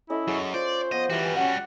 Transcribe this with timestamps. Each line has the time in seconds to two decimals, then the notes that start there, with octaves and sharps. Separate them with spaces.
0.10 C#4 E4 A4 D#5
0.28 F#2 G#4 C#5 E6
0.54 F4 C5 D5
0.92 F3 B3 D#5
1.10 E3 G3 F#4 G4
1.37 C#4 F#5